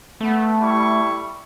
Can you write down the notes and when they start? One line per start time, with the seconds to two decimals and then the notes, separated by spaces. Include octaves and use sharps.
0.21 A3 B3
0.61 G3 E4 C#6